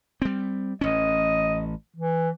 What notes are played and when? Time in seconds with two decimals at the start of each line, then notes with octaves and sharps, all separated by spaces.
0.22 G3 C4
0.81 A1 C#4 D#5
1.96 E3